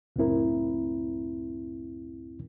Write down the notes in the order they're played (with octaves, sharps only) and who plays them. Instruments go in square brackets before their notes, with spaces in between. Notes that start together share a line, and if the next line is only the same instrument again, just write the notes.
[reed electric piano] C#2 F#2 A2 C4 E4 A#4